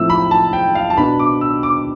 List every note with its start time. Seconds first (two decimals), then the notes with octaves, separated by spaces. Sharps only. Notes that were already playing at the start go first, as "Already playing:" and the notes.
Already playing: A2 F3 C4 E4 E6
0.10 B5
0.31 A5
0.53 G5
0.75 F5
0.90 A5
0.97 B2 B3 D4 B5
1.19 D6
1.41 E6
1.63 D6